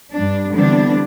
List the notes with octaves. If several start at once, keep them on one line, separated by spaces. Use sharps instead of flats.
G2 D4
D3 E3 G3 B3 C4 D4